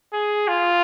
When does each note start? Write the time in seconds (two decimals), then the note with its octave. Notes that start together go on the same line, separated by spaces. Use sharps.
0.13 G#4
0.48 F4